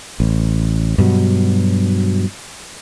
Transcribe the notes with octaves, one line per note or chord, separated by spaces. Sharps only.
A1
G2 B2 F#3